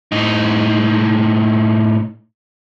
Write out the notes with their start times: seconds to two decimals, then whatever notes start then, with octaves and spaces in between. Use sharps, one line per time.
0.12 A2 D#4